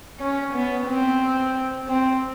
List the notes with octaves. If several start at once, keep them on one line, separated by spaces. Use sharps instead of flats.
C#4
B3
C4
C4